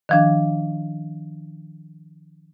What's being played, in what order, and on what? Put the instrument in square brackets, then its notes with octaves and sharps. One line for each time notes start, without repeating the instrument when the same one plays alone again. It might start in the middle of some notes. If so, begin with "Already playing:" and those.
[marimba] D#3 F3 D4